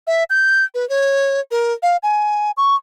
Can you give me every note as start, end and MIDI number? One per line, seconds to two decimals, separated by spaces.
0.07 0.24 76
0.30 0.64 91
0.74 0.87 71
0.89 1.40 73
1.51 1.73 70
1.83 1.97 77
2.03 2.51 80
2.57 2.75 85